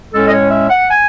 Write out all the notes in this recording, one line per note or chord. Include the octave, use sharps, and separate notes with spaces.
A2 G#3 C#4 A4
D#5
C#5
E5
F#5
G#5